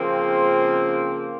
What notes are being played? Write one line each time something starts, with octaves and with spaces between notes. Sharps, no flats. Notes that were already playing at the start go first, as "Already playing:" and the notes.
Already playing: C#3 F3 A#3 C4